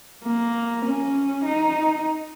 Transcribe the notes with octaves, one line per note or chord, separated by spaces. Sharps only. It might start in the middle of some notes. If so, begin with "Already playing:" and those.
A#3
C#4
D#4